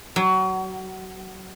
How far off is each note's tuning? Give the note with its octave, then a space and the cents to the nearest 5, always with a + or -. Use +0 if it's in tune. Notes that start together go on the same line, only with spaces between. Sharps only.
F#3 +25